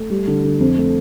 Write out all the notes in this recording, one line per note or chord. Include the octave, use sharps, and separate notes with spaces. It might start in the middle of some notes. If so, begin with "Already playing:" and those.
Already playing: A3
G3
D3
D3
F2
A3